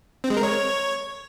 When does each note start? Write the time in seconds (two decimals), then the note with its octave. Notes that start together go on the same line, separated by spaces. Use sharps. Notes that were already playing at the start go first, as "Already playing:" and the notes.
0.24 C4
0.30 G#3
0.37 A#4
0.43 C#5